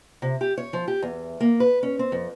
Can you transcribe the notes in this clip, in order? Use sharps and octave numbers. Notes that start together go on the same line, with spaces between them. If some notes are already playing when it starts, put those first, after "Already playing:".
C3
G4
C#5
F3
G4
E2
A#3
B4
C#4
C4
F2